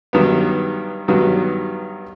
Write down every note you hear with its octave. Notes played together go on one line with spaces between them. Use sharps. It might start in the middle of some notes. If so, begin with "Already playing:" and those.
G2 D#3 F#3 B3
G2 D#3 F#3 B3